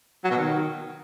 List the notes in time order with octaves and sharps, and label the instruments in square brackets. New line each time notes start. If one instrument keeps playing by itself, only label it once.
[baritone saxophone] F#3
B2
D#3